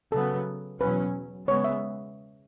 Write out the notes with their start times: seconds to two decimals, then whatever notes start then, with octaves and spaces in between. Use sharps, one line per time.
0.12 C#3 F#3 B3 A4
0.81 E2 B2 F#3 C#4 B4
1.48 C#3 G#3 B3 C#5
1.64 E5